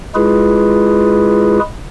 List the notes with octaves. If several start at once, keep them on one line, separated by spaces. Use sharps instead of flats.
G#3 E4 F4 G#4 B4